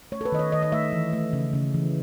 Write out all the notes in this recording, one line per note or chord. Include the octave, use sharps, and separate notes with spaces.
A3 C#5
A4
B4
D#3 D#5
C#5
D#3 D#5
D#5
A3 E5
E3
A3
C#3
C#3
E3